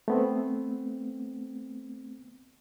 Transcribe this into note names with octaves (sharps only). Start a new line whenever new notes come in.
A3 B3 C4